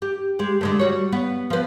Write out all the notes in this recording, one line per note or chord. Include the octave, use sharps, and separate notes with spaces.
G4
G#3 G4
D3 G#3 A3
G3 F#4 C#5
B3
F3 B4